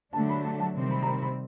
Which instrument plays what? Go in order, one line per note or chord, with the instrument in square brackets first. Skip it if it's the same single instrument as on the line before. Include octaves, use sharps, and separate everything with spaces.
[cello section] D3 F#3 A3 D4 [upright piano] A5
[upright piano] B5
A5
A5
[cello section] C3 D#3 G3 C4
[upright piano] B5
A#5
B5
B5